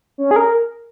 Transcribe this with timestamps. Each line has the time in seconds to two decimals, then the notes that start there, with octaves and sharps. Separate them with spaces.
0.18 C#4
0.31 G#4
0.36 A#4